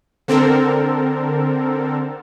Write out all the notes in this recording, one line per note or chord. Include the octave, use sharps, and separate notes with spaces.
D3 C4 A4 A#4